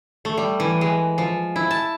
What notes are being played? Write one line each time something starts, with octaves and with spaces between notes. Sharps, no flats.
A3
G3
E3
G#3
F3
E4
A5